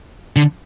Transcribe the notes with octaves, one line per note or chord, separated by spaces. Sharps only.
D3